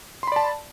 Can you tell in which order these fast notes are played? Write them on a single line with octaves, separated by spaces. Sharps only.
C6 B5 D5 A5